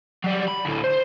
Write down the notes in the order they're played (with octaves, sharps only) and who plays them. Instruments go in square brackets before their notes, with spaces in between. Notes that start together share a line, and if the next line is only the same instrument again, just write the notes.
[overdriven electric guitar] F#3 G3
B5
D2 A2
C5